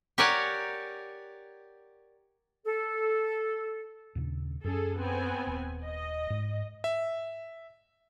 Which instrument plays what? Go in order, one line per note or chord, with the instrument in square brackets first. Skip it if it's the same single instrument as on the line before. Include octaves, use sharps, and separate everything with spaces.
[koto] G4 A#4 C#5 D5 F#5 G#5
[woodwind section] A4
[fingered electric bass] D#2 A#2 C#3
[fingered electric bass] F#2 C#4 [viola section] G#4 A4
[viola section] B3 C4 G#5
[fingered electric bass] D#1
[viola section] D#5
[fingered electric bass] G#2
[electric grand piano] E5